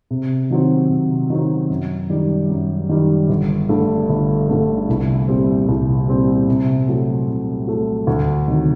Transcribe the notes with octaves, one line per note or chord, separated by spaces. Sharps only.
C3
D#3 F#3 C4
C3
D#3 F#3 C4
F#2
D#3 G3
F#2
D#3 G3
G1
G2 D3 A3
G1
G2 D3 A3
C2
A#2 G3 C4 G4
C2
A#2 G3 C4 G4
C3
F#3 A3
C3
F#3 A3
D2
C3 D#3 F#3